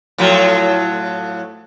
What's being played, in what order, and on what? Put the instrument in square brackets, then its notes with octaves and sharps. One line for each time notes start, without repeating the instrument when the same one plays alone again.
[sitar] A2 F3 F#3